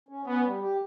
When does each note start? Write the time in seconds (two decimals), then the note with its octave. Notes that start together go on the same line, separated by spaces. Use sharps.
0.09 C#4
0.26 B3 C#4
0.43 G3
0.61 G4